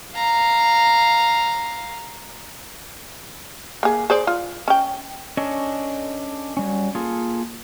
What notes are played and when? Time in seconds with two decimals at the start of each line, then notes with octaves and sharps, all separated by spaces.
0.15 F5 A#5
3.83 A#3 G#4
4.10 G#4 C5 D5
4.27 F4
4.68 C#4 G5
5.37 C#4 D4 A4 C#5 D#5
6.57 F#3 G3 C#4
6.95 A#3 F4 G#4 A4